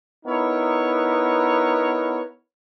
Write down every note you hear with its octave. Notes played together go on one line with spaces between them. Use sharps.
B3 D#4 E4 A#4 C#5